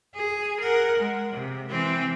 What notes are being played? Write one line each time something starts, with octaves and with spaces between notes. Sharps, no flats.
G#4
A#4 F#5
G#3
C3
E3 C4